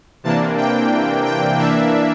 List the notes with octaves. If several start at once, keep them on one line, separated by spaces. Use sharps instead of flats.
C3 E3 A#3 D4 A5
G5
G5
E3 A#3 D4 E5